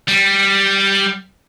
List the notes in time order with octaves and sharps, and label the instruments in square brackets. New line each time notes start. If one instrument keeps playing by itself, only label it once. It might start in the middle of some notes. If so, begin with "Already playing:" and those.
[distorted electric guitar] G3